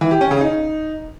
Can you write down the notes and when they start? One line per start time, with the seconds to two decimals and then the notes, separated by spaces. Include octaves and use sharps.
0.01 E3
0.11 G4
0.21 C#4
0.31 C#3
0.41 D#4